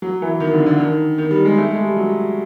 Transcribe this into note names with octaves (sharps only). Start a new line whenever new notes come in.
F#3
E3
D#3
D3
D3
D#3
D#3
G3
G#3
A3
G#3
G3
F#3